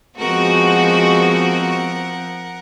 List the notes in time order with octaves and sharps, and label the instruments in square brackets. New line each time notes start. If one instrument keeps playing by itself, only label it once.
[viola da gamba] F3 C4 [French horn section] G#3 B3 G#4 [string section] F#4 [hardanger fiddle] A#4 F#5